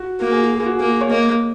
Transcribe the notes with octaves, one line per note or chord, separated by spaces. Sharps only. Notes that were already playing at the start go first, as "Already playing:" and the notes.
Already playing: F#4
A#3 F#4
G#4
F#4
G#4
F#4
A#3 G#4
F#4
C#5
A#3 D#5